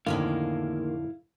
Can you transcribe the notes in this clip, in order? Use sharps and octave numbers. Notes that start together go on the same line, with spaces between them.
F2 A2 D3 D#3 G#3 A#3 E4 F5